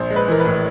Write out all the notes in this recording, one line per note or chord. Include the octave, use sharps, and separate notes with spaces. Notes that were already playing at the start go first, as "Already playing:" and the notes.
Already playing: A#1 C5
G#3
B4
E3 A#4
B4
A2